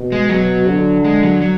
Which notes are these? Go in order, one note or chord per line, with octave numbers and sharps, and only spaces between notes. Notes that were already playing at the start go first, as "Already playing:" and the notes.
Already playing: B2
G#3
B2 F#3
D3
G#3
F#3
F#3